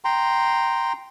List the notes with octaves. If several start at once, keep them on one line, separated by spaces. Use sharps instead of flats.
G5 A#5 C6